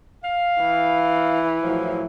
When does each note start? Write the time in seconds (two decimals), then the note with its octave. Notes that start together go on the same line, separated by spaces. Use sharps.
0.24 F5
0.61 E3
1.63 A2 F3 F#3